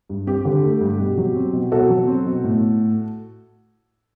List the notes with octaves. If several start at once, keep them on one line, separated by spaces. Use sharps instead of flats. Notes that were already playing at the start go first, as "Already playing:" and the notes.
G2
C4 G4
D3
A3
G2
B2
F#3
C4
B2
B2 F#4 A4
F#3
C4
B2
A2